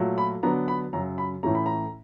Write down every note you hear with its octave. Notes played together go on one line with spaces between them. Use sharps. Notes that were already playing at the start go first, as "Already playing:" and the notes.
Already playing: A#2 F#3 A3
B5
D3 F#3 B3 D4 A#5
B5
F#2 C#3 F#3 A#5
B5
A2 E3 A3 C#4 A#5
B5
A#5